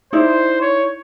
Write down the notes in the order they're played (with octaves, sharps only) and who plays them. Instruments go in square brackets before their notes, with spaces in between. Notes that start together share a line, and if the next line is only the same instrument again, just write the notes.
[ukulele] D#4 E4 D5 [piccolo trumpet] C5
[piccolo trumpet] C#5